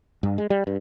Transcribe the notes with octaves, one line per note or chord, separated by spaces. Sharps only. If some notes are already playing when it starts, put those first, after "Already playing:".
G2
G#3
G3
G2